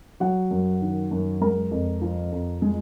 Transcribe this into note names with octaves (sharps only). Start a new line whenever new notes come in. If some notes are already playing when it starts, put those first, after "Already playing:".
F#3 F#4 F#5
F#2
D#3
F#2
G#3 A#4 A#5
F2
F3
F2
G#3